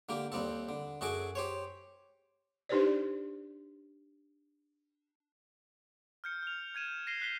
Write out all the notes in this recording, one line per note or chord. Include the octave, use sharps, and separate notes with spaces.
D3 A#3 G4
D#2 G3 C4 A4
D3
F#2 F#4 G#4 A4 G#5 D6
G4 C5 C#5
D4 D#4 G4 B4 C5 D5
F6 G6 C#7
F6 F7
G6 G#6 D#7 E7
A#6 C7 D#7 G7
F#6 B6 G7